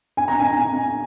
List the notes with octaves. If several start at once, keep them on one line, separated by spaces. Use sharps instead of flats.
G#5
A#5
G#5